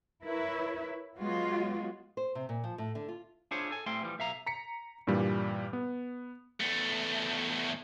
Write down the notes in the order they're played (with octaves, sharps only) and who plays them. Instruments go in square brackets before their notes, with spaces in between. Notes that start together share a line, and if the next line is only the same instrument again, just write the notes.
[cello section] E4 A#4 B4 C#5 E5
F#3 G#3 B3 F4 F#4
[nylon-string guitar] C5
C3
A#2
F3
A2
D3
F4
[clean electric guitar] D4 E4 F4 G#4 C5 C#5
A4 G#5
A2 G3 A3 C4 G#5 C6
E3 F3 G3
B1 E5 F5 A#5
[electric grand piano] A#5 B6 C#7
G2 A#2 E3 G3
B3
[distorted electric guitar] E2 A3